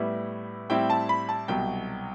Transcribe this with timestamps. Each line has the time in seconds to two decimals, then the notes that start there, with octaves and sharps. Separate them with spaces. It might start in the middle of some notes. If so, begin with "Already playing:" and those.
Already playing: A2 G3 B3 E4
0.70 A2 G3 C4 E4 G5
0.90 A5
1.09 B5
1.29 A5
1.48 C2 B2 F#3 G5